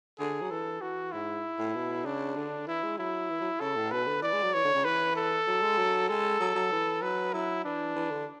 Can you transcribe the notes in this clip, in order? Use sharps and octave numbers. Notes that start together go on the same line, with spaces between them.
D3 G#4
F#3
E3 A4
E3 F#4
G#2 E4
A2
B2
C#3 D4
D3
E3 E4
G#3
F#3 E4
E3
F#3
C#3 A4
A2
B2 B4
D3
E3 D5
G#3
F#3
E3 C#5
D3
C#3
E3 B4
A4
F#3
G#3
F#3
G#3 A4
F#3
F#3
E3
F#3 B4
F#3 E4
E3 D4
E3
D3